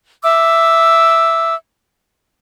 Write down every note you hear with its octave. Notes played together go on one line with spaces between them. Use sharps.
E5 D6 E6